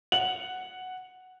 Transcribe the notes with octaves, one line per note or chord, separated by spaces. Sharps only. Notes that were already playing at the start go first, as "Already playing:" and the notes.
F#5 F#7